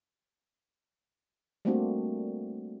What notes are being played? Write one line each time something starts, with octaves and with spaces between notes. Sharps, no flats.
G3 A3 A#3 C4 D4 F#4